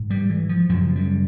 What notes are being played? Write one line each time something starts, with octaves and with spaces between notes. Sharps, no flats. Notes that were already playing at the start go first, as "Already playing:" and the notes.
Already playing: G#2
G3
E3
F3
F#2 C#3 F3
G3